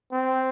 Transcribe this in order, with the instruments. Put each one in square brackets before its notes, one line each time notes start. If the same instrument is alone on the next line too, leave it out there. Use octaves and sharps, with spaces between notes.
[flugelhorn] C4